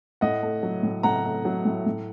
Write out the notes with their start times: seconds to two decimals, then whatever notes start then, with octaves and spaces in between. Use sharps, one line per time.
0.21 A2 D#5 F#5
0.43 A3
0.63 F#3
0.83 A2
1.03 A2 F#5 A#5
1.24 A3
1.45 F#3
1.65 A2
1.86 A2